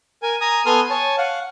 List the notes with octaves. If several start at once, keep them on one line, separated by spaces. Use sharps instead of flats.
A#4 G#5
G#5 A#5 D#6
B3 A4 G#5 C6 D#6 F6
C#5 G#5 A5
F5 F#5